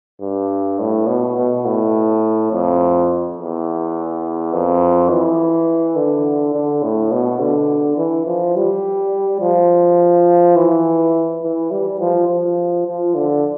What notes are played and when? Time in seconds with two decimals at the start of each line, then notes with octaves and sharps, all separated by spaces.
0.21 G2
0.79 A2
1.08 B2
1.36 B2
1.65 A2
2.52 F2
3.38 E2
4.53 F2
5.10 E3
5.96 D3
6.53 D3
6.83 A2
7.12 B2
7.41 D3
7.97 E3
8.26 F3
8.56 G3
9.41 F3
10.56 E3
11.43 E3
11.71 G3
11.99 F3
12.28 F3
12.87 F3
13.15 D3